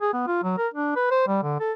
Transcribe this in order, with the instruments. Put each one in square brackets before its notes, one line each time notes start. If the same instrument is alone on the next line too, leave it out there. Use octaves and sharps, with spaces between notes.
[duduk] G#4
B3
F4
F#3
A#4
D4
B4
C5
G3
D3
A4